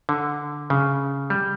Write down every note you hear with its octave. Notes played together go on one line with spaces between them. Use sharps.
D3
C#3
G3